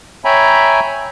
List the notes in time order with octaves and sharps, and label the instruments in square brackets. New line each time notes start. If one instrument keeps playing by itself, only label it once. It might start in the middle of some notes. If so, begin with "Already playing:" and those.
[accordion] C#5 E5 G5 G#5 A#5 B5